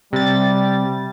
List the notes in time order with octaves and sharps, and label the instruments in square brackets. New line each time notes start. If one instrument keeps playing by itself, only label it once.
[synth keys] C3 A6 [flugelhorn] G3